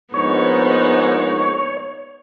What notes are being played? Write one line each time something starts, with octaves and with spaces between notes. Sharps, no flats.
A#1 G#2 B3 D#4 C#5